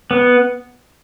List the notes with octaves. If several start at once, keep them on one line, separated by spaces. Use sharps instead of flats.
B3